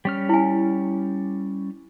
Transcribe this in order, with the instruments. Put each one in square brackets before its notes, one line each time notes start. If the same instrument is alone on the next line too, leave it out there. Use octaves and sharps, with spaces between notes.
[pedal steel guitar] G3 C#4 F6
[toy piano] E4 G#5